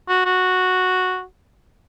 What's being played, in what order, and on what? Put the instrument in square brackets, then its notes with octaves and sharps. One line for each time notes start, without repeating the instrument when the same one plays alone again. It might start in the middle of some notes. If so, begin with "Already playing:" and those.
[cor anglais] F#4
F#4